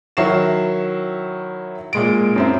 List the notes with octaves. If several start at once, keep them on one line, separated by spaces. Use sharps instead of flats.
D#3 F#3 E4 C#6 C7 E7
A#2 G#3 D7
F#2 C4 E4